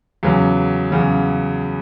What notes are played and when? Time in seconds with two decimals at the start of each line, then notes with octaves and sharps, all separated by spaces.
0.23 E2 C#3 F#3
0.92 E2 C#3 F#3